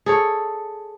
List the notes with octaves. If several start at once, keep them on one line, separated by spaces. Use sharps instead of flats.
G#4 A4 C#5